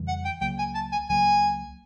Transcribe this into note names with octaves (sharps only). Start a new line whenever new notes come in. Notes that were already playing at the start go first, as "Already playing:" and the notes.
Already playing: F2 C#3 E3 G3
F#5
G5
C#2 C#3 F#3 A#3 G5
G#5
A5
G#5
C#2 C#3 F#3 A#3 G#5